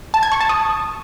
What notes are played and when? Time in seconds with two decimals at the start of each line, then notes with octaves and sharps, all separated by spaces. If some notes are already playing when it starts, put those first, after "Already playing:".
0.14 A5
0.23 G#6
0.32 C#6
0.41 A5
0.49 D#6